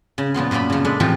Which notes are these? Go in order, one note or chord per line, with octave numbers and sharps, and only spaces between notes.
C#3
A#2 F3 B3 C6
F#2 A#2 F3 A#3 B5
C#3 F3
G#3 D4 A4 B4
A2 C3 E3 F3 F4 G4